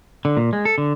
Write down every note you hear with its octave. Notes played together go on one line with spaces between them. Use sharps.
D3
A#2
G#3
A4
D3